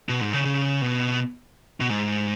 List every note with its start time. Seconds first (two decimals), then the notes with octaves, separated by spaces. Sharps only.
0.09 B2
0.21 G#2
0.33 C#3
0.45 C#3
0.82 B2
1.80 B2
1.90 G#2